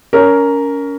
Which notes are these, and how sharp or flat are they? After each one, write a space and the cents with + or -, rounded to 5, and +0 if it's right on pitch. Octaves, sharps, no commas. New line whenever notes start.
C#4 +25 A#4 +0